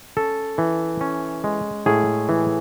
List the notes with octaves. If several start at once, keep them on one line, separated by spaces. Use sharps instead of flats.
C#4 A4
E3
C#4
G#3
A2 G#4
E3